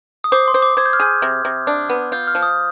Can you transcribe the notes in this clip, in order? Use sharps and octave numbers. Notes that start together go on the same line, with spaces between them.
D#6
C5 D6
C6
C5
D6
C5 G#6
G6
F6
G#4 G6
C3
C3
D4
B3
F4 G6
F6
F3
D#6